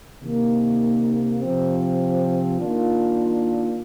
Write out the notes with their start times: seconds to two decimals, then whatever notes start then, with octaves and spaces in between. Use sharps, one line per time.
0.22 C3 D#3 A#3
1.40 C3 F3 C4
2.59 D#3 A#3 D4 F4